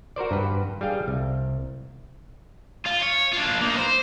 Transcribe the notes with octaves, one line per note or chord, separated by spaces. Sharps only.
F#4 A#4 C5 D5
G2 B4
G3 G#4 F5 G5
C2
F4
C#5
D4 F4
A#3 D#4
B4 C5